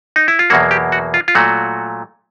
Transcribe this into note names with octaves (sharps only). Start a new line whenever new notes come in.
D#4
E4
F4
E2 B2 F#3 A#3 F#4
G4
F#4
F4
F4
A#2 F#3 A3 F#4